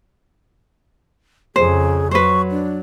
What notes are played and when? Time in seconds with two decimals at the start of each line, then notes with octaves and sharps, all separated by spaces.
1.56 F2 C#3 G#4 C5
2.11 F#3 B4 C5 C#6
2.51 D4